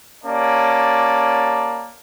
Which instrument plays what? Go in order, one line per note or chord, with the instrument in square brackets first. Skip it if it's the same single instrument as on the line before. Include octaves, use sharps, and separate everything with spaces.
[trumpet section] A#3 C#4 G4 D5 A5